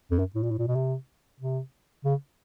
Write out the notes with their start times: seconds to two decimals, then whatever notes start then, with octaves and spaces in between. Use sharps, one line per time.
0.11 F2
0.19 F#2
0.35 A2
0.43 A#2
0.51 A2
0.59 A#2
0.68 B2
0.75 C3
1.40 C3
2.05 C#3